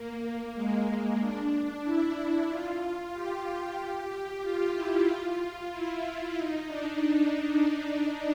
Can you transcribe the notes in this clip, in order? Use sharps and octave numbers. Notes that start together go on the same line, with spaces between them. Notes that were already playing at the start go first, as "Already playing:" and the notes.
Already playing: A#3
G#3
D4
E4
F4
G4
F4
E4
F4
F4
E4
D#4
D4